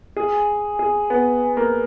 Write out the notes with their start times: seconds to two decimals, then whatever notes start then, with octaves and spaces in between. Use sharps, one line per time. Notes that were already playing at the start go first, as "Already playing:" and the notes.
0.16 G#4 G#5
0.79 G#4
1.10 B3
1.57 A#3